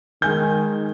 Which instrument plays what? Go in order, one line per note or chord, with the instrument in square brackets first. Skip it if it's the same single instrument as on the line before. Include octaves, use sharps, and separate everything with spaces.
[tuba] D#3 [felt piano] G#3 G#5 G6